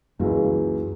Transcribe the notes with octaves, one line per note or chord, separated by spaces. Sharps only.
C#2 F#2 E3 F#3 A#3